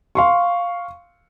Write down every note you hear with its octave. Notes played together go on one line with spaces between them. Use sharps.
F5 C6 C#6